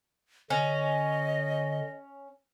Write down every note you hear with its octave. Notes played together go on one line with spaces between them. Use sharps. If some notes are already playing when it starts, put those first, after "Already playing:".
D3 C#4 D#5